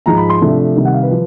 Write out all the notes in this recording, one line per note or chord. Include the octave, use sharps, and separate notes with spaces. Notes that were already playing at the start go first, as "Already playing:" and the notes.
G#2 F3 G#3 A#5
B5
C6
C3 F3 A3 D4
C3 D#3 G3
F#5
F5
B4
F3